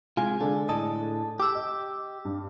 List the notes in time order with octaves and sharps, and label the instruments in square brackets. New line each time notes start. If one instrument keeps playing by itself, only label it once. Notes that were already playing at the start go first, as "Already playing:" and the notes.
[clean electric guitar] C3 G#3 F4 [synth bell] G#5
[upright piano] D3 G#3 D4 [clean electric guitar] A4
[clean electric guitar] A2 A4 D#5 [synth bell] A5
[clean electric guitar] G4 [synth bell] D6 E6
[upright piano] D#5
G2